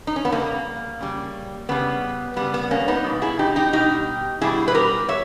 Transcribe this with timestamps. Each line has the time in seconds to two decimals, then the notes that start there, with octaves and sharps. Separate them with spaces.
0.07 D#4
0.16 C#4
0.25 B3
0.32 C#3 G3 A#3
1.00 C#3 G3
1.69 C#3 G3 B3
2.36 C#3 G3 B3
2.54 B3
2.71 A#3 C#4
2.88 B3 D#4
3.04 B2 G3
3.22 E4 G#4
3.39 D#4 G4
3.56 D#4 G4
3.72 B2 G3 D#4 G4
4.41 B2 G3 E4 G#4
4.68 B4
4.75 G4 A#4
5.09 C#5 E5